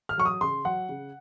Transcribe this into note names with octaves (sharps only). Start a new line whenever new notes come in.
F6
F#3 C#6
D#6
C#3 C6
F#3 F#5
C#3